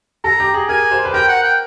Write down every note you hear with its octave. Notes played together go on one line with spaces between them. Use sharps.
A4 A#5
G4
G#4
A#4 G#5
C5
B4
A#4 G5
F#5
G5